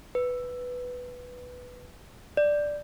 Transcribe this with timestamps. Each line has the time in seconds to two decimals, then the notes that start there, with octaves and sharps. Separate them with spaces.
0.15 B4
2.37 D5